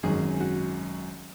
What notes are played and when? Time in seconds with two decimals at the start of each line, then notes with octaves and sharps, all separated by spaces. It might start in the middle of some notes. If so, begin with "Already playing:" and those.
0.03 G#1 F#2 D#3 G#4
0.40 F#4